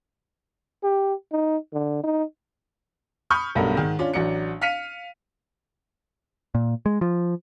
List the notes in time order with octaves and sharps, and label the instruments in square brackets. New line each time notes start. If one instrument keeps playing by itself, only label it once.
[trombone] G4
D#4
D3
D#4
[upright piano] B5 C#6 D#6 F6 G6
B1 G2 A3 B3 A#4
G#2 D#3
C#4 D4 F4
A1 F#3 D4 C#7
F5 F6 B6 C#7 D#7 F7
[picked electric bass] A#2
G#3
F3